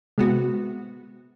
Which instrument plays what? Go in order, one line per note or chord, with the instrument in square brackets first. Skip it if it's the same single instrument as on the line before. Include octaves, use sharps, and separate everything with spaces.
[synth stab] C3 B3 F#4 [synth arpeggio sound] G#3